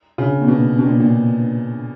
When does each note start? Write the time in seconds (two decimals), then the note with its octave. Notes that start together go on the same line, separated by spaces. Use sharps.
0.18 C#3
0.41 A#2
0.48 B2
0.79 B2
0.86 A#2
1.00 A#2